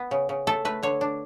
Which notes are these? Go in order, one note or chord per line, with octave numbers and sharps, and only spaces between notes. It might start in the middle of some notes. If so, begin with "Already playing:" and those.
Already playing: B3
C#3
C#3
A3 A4
A3 B4
D3 C#5
D4